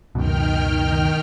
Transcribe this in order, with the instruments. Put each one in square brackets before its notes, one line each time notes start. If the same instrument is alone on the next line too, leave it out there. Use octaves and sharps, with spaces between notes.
[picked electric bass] C#2 F#2 B2 [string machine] D#3 G5 F6